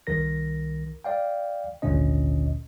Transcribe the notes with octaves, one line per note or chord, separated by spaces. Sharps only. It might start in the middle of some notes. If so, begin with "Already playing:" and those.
C2 D#3 A#4 A#6
D5 F5 G5
G#1 D2 A#2 D3 C#4 D#5